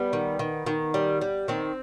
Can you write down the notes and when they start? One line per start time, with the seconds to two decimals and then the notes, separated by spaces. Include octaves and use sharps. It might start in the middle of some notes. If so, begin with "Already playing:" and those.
Already playing: G3 B3
0.13 D#3
0.39 D#3
0.66 D#3
0.94 G3
1.21 G3
1.48 D#3 C4